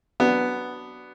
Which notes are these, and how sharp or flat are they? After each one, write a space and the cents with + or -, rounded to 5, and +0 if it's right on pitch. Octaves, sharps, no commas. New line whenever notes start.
F#3 +20 B3 +0 D4 +0